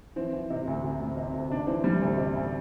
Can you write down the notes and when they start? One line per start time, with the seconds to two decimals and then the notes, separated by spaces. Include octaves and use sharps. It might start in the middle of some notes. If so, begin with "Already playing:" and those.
0.16 E3 C4
0.33 E3
0.50 C3
0.67 D2
0.84 D2
1.00 D2
1.17 C3
1.34 D2
1.50 C3 D4
1.67 E3 C4
1.84 E3 G3
2.01 D2 C4
2.17 C3
2.35 D2